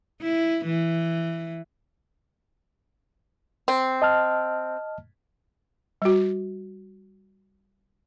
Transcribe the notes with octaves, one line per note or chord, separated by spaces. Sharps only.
E4
E3
C4
D#5 A5 F6
G3 F#4